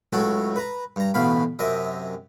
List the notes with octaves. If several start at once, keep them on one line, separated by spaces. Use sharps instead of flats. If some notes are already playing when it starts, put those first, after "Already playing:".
C#2 A2 F#3 F#4 A4
B4 A#5
G2 A#5
A1 D2 B2 F5 B5
F#2 C3 D#5 E5